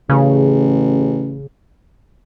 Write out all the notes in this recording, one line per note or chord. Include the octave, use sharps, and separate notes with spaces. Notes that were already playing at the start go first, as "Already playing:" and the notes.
A1 C#3